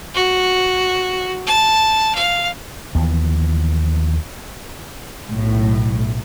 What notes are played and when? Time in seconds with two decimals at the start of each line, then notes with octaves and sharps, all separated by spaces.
0.15 F#4
1.47 A5
2.15 F5
2.95 D#2 E3 F3 B3
5.30 B1 A2